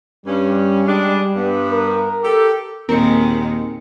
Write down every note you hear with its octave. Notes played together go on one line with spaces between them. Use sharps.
G2 G3 C#4
G#3 D4
G2 B3
A#4
G4 A4
D#2 A#2 D#3 G#3 C4 A#4 C#7